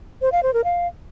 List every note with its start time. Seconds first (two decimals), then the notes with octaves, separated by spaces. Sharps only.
0.22 C5
0.32 F5
0.43 C5
0.54 A#4
0.64 F5